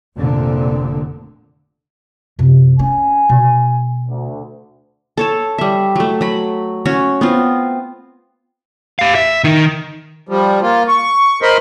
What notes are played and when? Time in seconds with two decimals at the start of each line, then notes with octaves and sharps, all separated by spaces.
0.17 F1 A#2 D3
2.39 F#2 C3
2.79 C#4 G#5
3.29 B2
4.08 D2
5.17 A4 C#5 A5
5.58 G3 E5
5.96 F#3 A3
6.21 F#3 B5
6.85 C#4 F#4 C#5
7.21 B3 C4 F4
8.99 G4 F5
9.15 E5
9.44 D#3 D#4
10.29 F3 G3
10.62 A#3 F4
10.88 C#6
11.42 A#4 C5 D#5 B5 C6